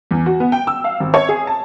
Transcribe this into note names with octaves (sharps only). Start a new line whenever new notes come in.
E2
F#4
B3
G5
E6
F5
G#1
C#5
G#4
A5